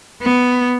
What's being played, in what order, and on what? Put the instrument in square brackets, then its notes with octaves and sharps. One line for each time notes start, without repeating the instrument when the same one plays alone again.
[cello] B3